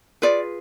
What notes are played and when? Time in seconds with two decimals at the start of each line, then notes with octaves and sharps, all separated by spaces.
0.22 F4 G#4 B4 D5